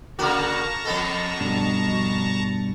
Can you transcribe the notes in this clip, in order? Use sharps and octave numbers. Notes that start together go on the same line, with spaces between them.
C#3 A#3 F#4 A#4 A5 A#5 C#6
F2 B3 A4 D#5
G2 B2 D4
F#4